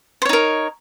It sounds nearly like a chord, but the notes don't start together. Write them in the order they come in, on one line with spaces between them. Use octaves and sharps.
C5 C#5 D#4 A#4